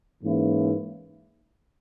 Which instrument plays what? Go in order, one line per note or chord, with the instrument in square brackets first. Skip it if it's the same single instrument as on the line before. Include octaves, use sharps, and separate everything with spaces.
[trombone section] G#2 E3 A#3 C#4 E4